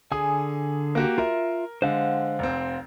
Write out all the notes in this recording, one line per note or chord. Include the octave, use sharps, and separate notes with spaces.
D3 G#4 G#5 D#6
A#3 F#4 G4
F4 A#4 E5
D3 G#3 C5 F5 F#5
F1 C4